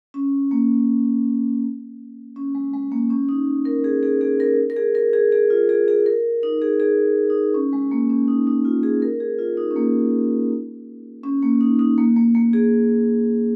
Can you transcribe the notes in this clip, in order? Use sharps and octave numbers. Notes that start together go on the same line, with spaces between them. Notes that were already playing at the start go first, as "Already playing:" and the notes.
C#4
A#3
C#4
G#3
G#3
A#3
C#4
D#4
A#4
G#4
G#4
G#4
A#4
A#4
G#4
A#4
G#4
G#4
F4
G#4
G#4
A#4
D#4
G#4
G#4
D#4
C#4
G#3
A#3
C#4
D#4
D#4
F4
G#4
A#4
G#4
F4
D#4
C#4
A#3
C#4
A#3
D#4
D#4
A#3
A#3
A#3
G#4